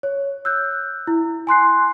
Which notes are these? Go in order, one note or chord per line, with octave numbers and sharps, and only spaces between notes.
C#5
E6 F#6 G6
E4
G#5 C6 F#6 C7